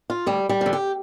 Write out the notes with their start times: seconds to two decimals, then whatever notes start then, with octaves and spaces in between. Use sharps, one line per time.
0.10 F4
0.26 D2 G3
0.49 G3
0.61 D3 F3
0.73 G4